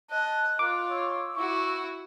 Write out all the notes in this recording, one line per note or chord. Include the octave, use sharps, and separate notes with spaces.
D#5 A5 F#6
F4 A#4 D6
C#5 E6
E4 F#4 C#6